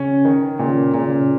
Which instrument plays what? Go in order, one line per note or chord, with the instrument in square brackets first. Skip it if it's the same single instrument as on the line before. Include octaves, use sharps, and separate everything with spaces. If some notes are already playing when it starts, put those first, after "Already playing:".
Already playing: [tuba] C#3 [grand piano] C#4
[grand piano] D#3
[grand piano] A#2 [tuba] C#3
[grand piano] A#2 [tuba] C#3